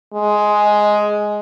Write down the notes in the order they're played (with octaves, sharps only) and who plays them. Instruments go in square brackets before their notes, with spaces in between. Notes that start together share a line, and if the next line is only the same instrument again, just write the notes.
[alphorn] G#3